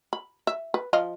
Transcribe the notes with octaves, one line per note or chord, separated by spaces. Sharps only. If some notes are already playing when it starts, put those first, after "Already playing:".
B5
E5
B4
F3 D#5 F5